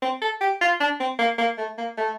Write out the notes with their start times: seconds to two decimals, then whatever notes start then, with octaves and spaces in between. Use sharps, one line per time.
0.02 C4
0.21 A4
0.41 G4
0.61 F4
0.80 D4
1.00 C4
1.19 A#3
1.38 A#3
1.58 A3
1.78 A#3
1.97 A3